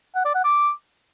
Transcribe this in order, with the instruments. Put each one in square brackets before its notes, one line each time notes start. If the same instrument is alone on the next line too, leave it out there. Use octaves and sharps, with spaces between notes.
[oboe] F#5
D5
F#5
D6